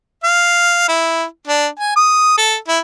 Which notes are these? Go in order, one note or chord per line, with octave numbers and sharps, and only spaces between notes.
F5
E4
D4
G#5
D#6
A4
E4